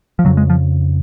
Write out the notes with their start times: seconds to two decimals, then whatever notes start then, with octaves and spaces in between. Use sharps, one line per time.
0.19 F3
0.25 F2 C#3 F#3
0.37 G#3
0.50 F3